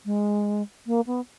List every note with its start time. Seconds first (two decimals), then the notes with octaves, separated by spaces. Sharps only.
0.06 G#3
0.87 A#3
1.07 B3